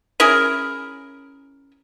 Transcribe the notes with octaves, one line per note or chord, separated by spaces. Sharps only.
C#4 E4 G#4 A#4